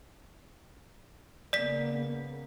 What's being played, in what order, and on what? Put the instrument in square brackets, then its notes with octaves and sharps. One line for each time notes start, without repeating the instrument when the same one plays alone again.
[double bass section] C#3 A#3 B3 [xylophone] D5 B6